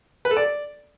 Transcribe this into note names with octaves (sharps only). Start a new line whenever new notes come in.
B4
A4
D5